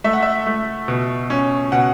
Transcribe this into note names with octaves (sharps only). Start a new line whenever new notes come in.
A3 E5
F#5
E5
A3
B2
C#4
B2 F#5